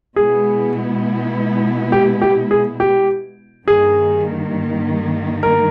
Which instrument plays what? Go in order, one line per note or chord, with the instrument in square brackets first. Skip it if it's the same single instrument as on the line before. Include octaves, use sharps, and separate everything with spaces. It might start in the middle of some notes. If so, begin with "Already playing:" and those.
[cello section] B2 G#3 B3 E4 [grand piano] G#4
[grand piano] G4
G4
G#4
G4
[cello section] G2 D#3 A#3 [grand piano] G#4
[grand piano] A#4